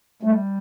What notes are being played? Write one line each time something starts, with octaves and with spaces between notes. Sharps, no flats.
G3 A3